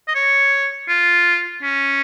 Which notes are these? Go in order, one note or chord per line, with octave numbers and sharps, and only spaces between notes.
D#5
C#5
F4
C#4